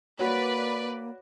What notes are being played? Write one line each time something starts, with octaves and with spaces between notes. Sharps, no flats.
A#3 F#4 B4 C#5 D5